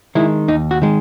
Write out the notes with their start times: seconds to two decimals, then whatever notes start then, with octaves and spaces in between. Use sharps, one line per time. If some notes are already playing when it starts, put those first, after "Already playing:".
0.15 D#3 G#3 E4
0.48 D#2 D#4
0.71 F#4
0.82 D#3 G#3